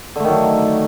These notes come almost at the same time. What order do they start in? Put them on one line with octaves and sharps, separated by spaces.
D3 A3 D#3 F#3